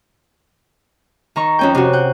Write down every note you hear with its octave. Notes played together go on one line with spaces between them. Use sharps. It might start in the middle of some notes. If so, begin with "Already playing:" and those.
D#3 A#5 C#6
F2 C#4 G5
C3 F#4
F#5 G5